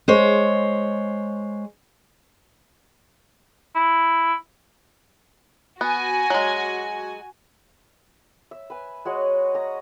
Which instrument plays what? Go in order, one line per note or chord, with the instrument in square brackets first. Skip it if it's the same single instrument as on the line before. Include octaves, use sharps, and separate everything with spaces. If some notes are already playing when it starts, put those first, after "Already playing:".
[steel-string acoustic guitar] G#3 C5 C#5
[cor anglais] E4
[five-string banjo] B3 [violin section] F#4 G#5
[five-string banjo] F#3 G#3
[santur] E5
B4 G#5
G#3 F#4 C#5 D#5
D#5 A#5